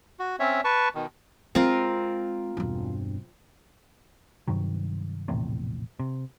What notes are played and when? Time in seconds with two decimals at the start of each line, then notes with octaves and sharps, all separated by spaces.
0.20 F#4
0.39 C4 C#4 C#5 E5
0.64 B4 A5 C#6
0.95 B2 D#3
1.55 G#3 C4 F4 A#4
2.57 E1 G2
4.48 G2 C3 D#3 F#3
5.28 A#1 E2 A2 C3
5.99 C3